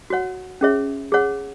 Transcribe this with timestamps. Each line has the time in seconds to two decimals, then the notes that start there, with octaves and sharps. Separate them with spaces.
0.10 F#4 C#5 F#5
0.61 C#4 G#4 C#5 E5
1.12 G#4 C#5 F#5